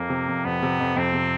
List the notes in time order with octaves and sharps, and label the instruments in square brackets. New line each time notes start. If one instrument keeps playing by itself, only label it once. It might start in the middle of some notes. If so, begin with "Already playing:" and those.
Already playing: [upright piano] F2 [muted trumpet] A#3
[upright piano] C3
F2
[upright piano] F2 [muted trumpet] B3
[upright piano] C3
F2
[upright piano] F2 [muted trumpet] C4
[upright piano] C3